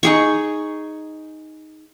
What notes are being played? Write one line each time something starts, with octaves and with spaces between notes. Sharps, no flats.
D#4 G#4 C#6